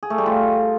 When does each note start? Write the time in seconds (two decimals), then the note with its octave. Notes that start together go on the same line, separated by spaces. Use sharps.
0.03 G#4
0.10 A3
0.18 G3
0.26 F4